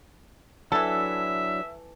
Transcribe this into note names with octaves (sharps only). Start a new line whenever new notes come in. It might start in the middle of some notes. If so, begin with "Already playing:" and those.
E3 F#3 D4 E4 A4 E5